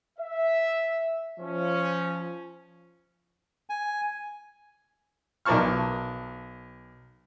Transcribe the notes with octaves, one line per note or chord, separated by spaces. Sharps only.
E5
F3 C#4
G#5
B1 A#4 D5 A5 C#6 F6